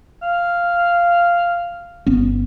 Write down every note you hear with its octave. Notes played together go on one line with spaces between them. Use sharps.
F5
G1 B3 C#4